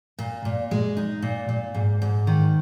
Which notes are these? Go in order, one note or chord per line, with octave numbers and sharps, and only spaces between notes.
A#2
A#2
G#3
D#4
A#2
A#2
G#2
G#2
D#3